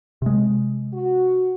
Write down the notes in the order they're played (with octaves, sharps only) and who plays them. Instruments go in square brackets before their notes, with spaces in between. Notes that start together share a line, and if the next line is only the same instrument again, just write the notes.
[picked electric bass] C3 G#3
[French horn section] F#4